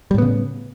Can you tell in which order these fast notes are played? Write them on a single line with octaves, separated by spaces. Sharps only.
G3 A2 B3 C#3